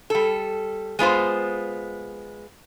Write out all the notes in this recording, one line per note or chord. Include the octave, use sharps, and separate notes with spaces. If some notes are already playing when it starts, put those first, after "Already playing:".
G3 A4
G#3 B3 F4 C5